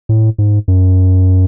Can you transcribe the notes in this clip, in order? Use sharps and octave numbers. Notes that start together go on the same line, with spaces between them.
A2
G#2
F#2